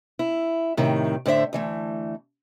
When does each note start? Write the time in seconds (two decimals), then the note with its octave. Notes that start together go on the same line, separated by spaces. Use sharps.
0.19 E4
0.77 A2 C3 D#3
1.26 A2 D3 C5 D5 E5
1.53 D2 E3 A3